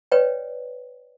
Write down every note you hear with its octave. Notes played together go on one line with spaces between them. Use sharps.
B4 C#5 D5 G5